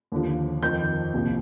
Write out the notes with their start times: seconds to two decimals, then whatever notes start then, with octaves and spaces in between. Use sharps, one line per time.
0.12 D#2 D3 F3
0.62 F2 D#3 G6
1.14 C2 A#2 F3